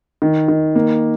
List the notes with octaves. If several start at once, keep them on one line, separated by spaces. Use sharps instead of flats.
D#3
D#3
A#3